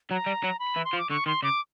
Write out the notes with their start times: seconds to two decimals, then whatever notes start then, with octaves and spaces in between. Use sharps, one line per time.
0.11 F#3 A#5
0.27 G3
0.44 F#3
0.59 B5
0.76 E3
0.85 C6
0.93 F3
0.99 D6
1.10 D3 C#6
1.26 D#3 C6
1.43 C#3 D6